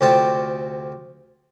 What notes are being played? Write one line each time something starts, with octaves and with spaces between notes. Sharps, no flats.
D2 C3 F4 G5 A5